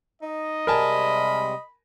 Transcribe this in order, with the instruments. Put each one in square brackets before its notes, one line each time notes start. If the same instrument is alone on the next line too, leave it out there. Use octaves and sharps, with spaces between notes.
[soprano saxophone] D#4 [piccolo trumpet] D#5
[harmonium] C3 G3 G#3 [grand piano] A#4 G#5 A5 [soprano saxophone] B5